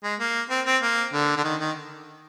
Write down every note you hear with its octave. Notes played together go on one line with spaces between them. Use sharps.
G#3
A#3
C4
C4
A#3
D3
D3
D#3
D#3